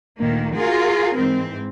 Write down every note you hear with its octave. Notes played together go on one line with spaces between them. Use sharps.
D2 A#2 D#3 A#3
F4 F#4 G#4 A#4
G#2 E3 C4